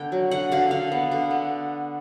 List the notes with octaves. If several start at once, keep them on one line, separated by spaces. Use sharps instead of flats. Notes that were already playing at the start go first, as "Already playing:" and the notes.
Already playing: D3 B3 G5
F#3
D3 F#5
D3 F5
D3 F5
B3
D3
B3